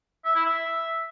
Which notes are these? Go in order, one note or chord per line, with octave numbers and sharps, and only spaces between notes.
E5
E4
E5